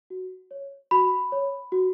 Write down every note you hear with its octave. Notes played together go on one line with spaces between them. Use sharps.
F#4
C#5
F#4 B5
C#5
F#4